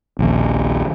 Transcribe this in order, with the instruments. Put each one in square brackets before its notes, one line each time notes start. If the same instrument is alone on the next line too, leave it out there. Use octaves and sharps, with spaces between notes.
[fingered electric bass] A#1 D#2